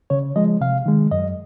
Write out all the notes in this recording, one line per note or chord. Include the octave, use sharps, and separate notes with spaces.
C#3 C#5
F3 G#3 D#5
C3 F5
D#3 G#3
F#2 D#5